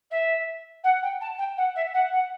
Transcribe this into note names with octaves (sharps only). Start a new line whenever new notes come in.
E5
F#5
G5
A5
G5
F#5
E5
F#5
F#5